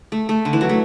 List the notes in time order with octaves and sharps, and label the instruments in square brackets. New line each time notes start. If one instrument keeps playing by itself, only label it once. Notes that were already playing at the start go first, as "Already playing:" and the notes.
[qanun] A3
A3
D3
E3
F#3
A3